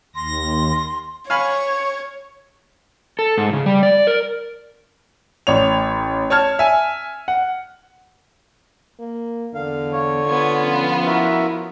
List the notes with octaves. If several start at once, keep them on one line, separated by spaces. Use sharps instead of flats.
D#2 C6 A#6
C#5 F5 G#5 B5 C#6
A4
G#2
C#3
G3
D5
A#4
A1 C#5 F7
C#5 A5 F6 G#6
E5 G#5
F#5
A#3
E2 D3 F5
C#5
B3 F4 G#6
F3 C#4
E4 F#4 A#4 E5